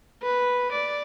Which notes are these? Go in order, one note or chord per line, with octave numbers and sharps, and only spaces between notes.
B4
D5